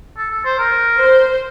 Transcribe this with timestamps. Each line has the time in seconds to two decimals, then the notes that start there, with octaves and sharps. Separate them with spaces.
0.17 A4
0.31 A4
0.45 C5
0.59 A#4
1.00 C5